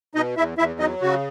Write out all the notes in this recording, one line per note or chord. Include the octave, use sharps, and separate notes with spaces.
B2 D#4 D#5
E2 E4 E5
E2 E4 E5
F#3 D#4 D#5
C#3 F#4